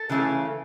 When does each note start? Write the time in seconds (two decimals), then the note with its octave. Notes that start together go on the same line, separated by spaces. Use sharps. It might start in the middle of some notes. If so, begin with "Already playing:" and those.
Already playing: A4
0.09 C#3 E3 A3 C#4